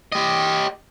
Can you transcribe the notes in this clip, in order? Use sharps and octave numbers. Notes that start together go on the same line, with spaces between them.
G4 D#5